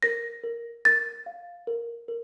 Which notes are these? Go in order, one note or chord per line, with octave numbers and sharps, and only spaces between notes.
A#4 A#6
A#4
A#4 A6
F5
A#4
A#4